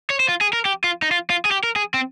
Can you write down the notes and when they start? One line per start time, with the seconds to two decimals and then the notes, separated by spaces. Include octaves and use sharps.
0.10 C#5
0.20 C5
0.29 F4
0.41 G#4
0.53 A#4
0.65 G4
0.84 F4
1.02 D#4
1.11 F4
1.30 F4
1.45 G#4
1.51 G4
1.64 A#4
1.76 G#4
1.94 C4